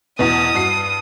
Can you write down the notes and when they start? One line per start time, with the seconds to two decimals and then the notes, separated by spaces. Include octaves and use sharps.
0.19 E2 B2 D#6
0.54 G2 F#4 C7